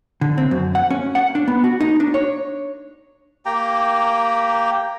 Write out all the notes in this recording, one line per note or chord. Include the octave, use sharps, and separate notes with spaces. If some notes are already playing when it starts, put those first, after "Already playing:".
D3
C4
F#2
F#5
C#4
F#5
D4
B3
F#4
D#4
D4
C#5
A#3 G4 G5 A#5